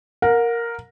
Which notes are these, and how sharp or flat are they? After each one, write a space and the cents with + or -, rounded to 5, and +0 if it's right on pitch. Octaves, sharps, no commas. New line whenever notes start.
A#4 +0 F#5 -40